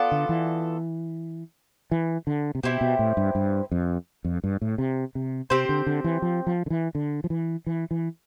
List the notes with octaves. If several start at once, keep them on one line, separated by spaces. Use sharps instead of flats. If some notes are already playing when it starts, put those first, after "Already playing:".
Already playing: B3 F4 A4 D5
D3
E3
E3
D3
C3
B2 C4 E4 G4 C5
B2
A2
G2
G2
F2
F2
G2
A2
C3
C3
C3 C4 G4 C5
D3
D3
E3
F3
F3
D3
E3
D3
F3
E3
E3
E3